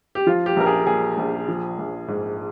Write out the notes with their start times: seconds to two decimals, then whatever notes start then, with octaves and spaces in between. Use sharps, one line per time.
0.15 G4
0.27 F3 F4
0.46 G4
0.56 A#1 A#4
0.66 G#4
0.87 A#2 G#4
1.18 A#1
1.48 F3
1.79 A#1
2.08 G#2